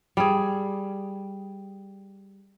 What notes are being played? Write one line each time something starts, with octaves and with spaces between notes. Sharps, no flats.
G3 G#4